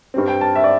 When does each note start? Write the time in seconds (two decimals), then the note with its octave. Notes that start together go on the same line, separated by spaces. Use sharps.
0.14 G2 G3 C4
0.28 G5
0.41 A5
0.55 E5
0.64 D5